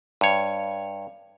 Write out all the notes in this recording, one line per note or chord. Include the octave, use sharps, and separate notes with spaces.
G2 C#5